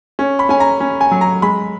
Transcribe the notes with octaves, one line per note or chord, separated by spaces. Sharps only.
C#4
B5
C#4 G#5
A#5
C#4
G#5
F#3
A#5
G#3 B5